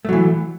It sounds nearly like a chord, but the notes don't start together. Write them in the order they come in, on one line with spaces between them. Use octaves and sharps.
A3 F#3 E3